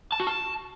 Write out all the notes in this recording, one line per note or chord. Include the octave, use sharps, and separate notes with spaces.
A5
F#4
A5